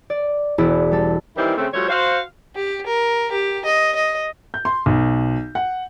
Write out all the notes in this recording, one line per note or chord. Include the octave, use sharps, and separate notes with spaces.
D5
E1 E4 G#4 D5 E6
G3 A4
D#3 E3 G3 C4 E4
C#3 A3 C4
F3 G3 A3 F#4 C5 C#5
F#4 C5 F5
G4
A#4
G4
D#5
D#5
G6
C6
B1
F#5